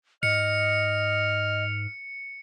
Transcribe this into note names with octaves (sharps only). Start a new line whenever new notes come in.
G#2 D#5 F6 C#7